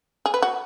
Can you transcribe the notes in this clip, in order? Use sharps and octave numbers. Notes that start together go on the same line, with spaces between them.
G#4
B4
F#4